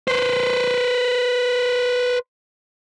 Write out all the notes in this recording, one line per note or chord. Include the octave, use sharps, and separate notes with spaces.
B4 C5